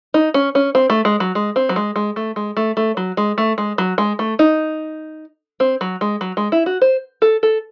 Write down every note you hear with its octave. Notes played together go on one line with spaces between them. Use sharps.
D#4
C#4
C#4
C4
A3
G#3
F#3
G#3
C4
F#3
G#3
G#3
A3
G#3
A3
A3
F#3
G#3
A3
G#3
F#3
G#3
A3
D#4
C4
F#3
G#3
F#3
G#3
E4
F#4
C5
A4
A4